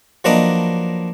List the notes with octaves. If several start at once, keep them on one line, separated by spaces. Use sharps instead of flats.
F3 F#3 A#3 D4 B4 D#5